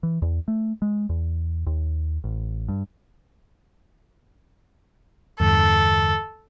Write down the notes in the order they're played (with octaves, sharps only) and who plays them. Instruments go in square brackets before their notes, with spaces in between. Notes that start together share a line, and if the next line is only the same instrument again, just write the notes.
[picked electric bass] E3
E2
A3
G#3
E2
D#2
A1
G2
[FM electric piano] E2 G2 D3 [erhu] A4